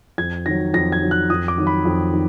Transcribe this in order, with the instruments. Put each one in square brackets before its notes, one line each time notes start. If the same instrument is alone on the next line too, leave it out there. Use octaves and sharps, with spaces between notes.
[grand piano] F2 G#6
D#3 F#3 A#6
F2 A#6
G#6
D#3 F#3
F#6
F2 D#6
D6
D#3 F#3
B5
F2
D#3